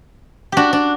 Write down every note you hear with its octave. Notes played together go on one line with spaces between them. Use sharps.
D4 F#4 G4
D4